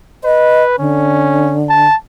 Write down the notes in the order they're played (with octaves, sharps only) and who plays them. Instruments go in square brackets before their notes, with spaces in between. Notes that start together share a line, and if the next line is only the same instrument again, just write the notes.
[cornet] B4 [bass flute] D#5
[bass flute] D3 [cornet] C#4
[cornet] A5